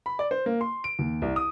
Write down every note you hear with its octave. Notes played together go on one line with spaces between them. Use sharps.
B5
D5
C5
A#3
C6
D7
D#2
C2
D#6